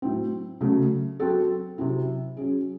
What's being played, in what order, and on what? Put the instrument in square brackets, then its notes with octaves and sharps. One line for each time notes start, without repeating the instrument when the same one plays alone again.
[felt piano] A2 F#3 C4
C#3 F#3 A3
F#3 C4 F#4 A4
C3 F#3 C4 E4
F#3 C#4 G#4